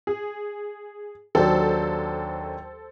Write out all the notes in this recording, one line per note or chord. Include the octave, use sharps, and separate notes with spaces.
G#4
D#2 F#3 D4 A4 C5